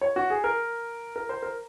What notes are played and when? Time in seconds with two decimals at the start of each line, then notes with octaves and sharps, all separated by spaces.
0.01 C#5
0.16 F#4
0.30 G#4
0.44 A#4
1.16 A#4
1.29 C5
1.43 A#4